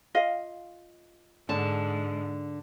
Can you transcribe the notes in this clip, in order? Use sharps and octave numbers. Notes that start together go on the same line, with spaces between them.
F4 D#5 F5
G#2 D3 A5